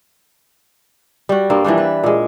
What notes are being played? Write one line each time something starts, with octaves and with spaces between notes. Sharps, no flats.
G3 F#4
G2 A#3 C4
E3 F3 G3 D4
B4
A#2 G#3